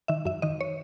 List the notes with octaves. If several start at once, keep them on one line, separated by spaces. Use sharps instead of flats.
D#3 E5
F#2 E5
D#3 D#5
C#5